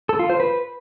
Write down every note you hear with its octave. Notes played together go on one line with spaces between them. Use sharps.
A4
F4
C5
B4